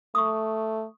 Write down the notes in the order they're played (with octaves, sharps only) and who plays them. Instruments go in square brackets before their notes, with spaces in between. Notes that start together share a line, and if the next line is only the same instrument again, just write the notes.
[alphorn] A3 [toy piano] C#6 D#6